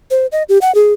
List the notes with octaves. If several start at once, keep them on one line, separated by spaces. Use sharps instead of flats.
C5
D#5
G4
F#5
G#4